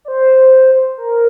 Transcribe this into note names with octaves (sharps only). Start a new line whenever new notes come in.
D5
C5
A#4